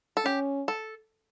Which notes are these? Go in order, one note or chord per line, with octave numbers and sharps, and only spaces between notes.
A4
C#4 G4
A4